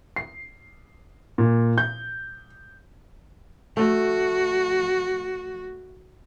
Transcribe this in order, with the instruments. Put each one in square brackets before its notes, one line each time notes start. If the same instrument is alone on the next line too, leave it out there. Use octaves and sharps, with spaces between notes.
[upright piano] C7
A#2
G6
[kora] A3 [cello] F#4